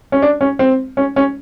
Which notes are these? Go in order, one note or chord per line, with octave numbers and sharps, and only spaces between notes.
C#4
D4
C#4
C4
C#4
C#4